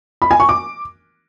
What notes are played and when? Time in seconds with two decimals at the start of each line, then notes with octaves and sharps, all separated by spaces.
0.22 B5
0.31 G#5
0.40 C#6
0.49 D6